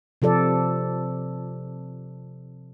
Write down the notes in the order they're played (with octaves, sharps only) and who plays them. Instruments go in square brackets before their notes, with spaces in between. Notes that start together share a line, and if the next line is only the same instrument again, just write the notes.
[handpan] C3 F3 A4 D5